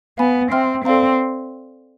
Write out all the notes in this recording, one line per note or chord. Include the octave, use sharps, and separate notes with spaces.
B3 F5 G#5 B5
C4 E5 G5 C6 F6
C4 A4 D5 F5 A#5